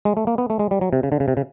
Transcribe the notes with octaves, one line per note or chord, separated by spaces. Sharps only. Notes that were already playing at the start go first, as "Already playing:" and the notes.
G#3
A3
A#3
B3
A3
G#3
G3
F#3
C3
C#3
D3
C#3
C3
C#3